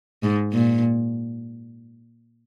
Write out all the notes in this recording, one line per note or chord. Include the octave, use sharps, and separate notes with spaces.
G#2
A#2